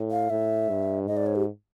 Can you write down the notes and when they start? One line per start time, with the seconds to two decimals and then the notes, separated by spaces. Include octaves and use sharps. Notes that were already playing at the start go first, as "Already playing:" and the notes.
Already playing: A2
0.11 F5
0.30 A2 E5
0.69 G2
1.07 G#2 D#5
1.17 D5
1.26 C#5
1.35 G4